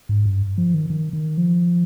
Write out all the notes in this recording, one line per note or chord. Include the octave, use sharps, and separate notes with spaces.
G#2
G2
F3
D#3
D#3
D#3
F3